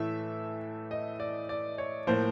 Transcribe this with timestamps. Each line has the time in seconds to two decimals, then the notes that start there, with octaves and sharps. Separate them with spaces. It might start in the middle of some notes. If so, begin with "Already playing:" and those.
Already playing: A2 E3 A3 E5
0.91 D#5
1.20 D5
1.49 D5
1.78 C#5
2.07 A2 F3 A#3 C5